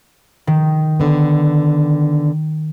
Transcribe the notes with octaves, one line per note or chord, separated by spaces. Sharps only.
D#3
D3 B3